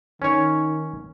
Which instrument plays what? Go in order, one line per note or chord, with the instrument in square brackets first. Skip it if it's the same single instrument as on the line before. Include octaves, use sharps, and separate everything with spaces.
[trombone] D#3 [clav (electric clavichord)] C#4 C#5